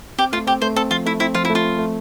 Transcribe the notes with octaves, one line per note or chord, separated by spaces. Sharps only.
C4 G4
A3 F4
C4 G4
A3 C5
C4 A4
F3 F4
A3 E4
C4 E4
F3 F4
E4
A3
F4
C4
A3